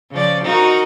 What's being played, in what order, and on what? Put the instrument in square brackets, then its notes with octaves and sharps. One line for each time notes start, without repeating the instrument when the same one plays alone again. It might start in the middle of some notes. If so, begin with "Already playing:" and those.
[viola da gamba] C#3 F3 D5
D#4 F#4 A#4